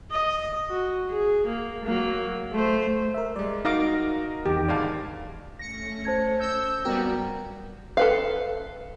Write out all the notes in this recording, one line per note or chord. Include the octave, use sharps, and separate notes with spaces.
D#5
F#4
G#4
A#3
F#3 A#3
A3 C5
A#4 E5
G3 G#3 D5
D#4 F#4 A#4 D#5 F5 D6 A#6
E2 D#3 G4
D2 G#2 D5 F5 A5
A3 C#4 A#6 C#7
C5 A5 G#6
E6 G6
F#2 G3 A#3 B3 F#4 G4
A4 B4 F5